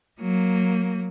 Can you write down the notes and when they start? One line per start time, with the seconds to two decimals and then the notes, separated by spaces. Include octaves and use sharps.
0.21 F#3 A#3